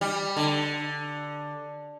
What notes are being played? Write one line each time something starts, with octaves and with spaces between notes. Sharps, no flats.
G3
D3